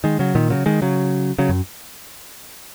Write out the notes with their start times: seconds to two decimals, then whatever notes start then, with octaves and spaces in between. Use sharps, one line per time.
0.04 D#3 G#3
0.19 C#3 F#3
0.35 A#2 D#3
0.50 C#3 F#3
0.66 D#3 G#3
0.82 C#3 F#3
1.39 C#3 F#3
1.49 F#2